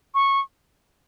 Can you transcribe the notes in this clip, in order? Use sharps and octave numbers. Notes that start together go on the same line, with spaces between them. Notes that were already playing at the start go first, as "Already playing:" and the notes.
C#6